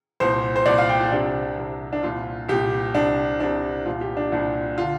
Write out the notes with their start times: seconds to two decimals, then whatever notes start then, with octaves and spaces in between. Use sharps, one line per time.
0.20 C2 A#2 C5
0.56 C5
0.66 C2 A#2 D5
0.78 F5
0.89 G5
1.00 F4
1.12 C2 C3 D4
1.58 C2 C3
1.93 D4
2.03 C2 A#2 F4
2.49 C2 A#2 G4
2.94 C2 C3 D4
3.40 C2 C3 D4
3.86 C2 A#2 F4
4.01 G4
4.17 D4
4.32 C2 A#2 D4
4.78 D3 F4